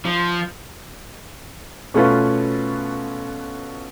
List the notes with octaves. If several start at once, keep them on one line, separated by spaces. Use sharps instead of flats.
F3
B2 A3 B3 C#4 F4 B4